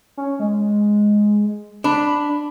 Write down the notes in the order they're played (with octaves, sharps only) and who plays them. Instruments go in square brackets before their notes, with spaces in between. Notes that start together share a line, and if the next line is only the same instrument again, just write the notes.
[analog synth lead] C#4
G#3
[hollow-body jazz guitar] D4 [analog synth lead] B5